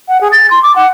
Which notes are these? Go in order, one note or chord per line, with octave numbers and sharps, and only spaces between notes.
F#5
G#4
A6
C6
D6
F#5